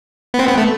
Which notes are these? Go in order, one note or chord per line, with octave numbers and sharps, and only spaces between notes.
B3
C4
B3
A3